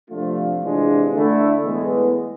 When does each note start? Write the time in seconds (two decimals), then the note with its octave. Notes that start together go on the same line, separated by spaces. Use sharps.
0.10 C3 F3 A3 D4 F4
0.61 C3 E3 G#3 D4 F4
1.12 D3 A3 E4
1.63 A2 E3 G#3 B3